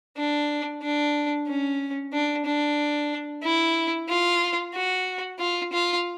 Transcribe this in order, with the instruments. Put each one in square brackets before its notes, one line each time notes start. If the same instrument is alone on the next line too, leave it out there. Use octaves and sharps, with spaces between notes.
[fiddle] D4
D4
C#4
D4
D4
E4
F4
F#4
F4
F4